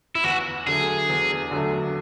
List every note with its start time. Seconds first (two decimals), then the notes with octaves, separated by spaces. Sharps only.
0.15 E4
0.24 E2 F#4
0.67 D3 F#3 A3 G#4
1.09 E2
1.51 D3 F#3 A3